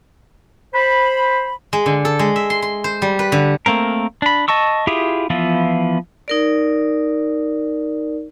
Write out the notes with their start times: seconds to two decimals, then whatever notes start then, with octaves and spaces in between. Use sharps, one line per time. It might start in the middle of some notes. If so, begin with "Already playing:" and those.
0.74 C5 B5
1.73 G#3
1.86 D3
2.05 A4
2.19 G#3
2.36 E5
2.50 C6
2.62 C6
2.84 C5
3.02 G3
3.19 B4
3.32 D3
3.66 A3 A#3 C4 A#4
4.22 D4 B5
4.48 D#5 A5 C#6 E6
4.87 E4 F4 G4 G#4 E5
5.30 E3 F3 B3 E4 F4
6.28 D#4 A#4 D5